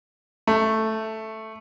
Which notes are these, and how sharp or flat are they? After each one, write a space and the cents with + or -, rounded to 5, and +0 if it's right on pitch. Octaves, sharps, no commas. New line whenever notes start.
A3 +0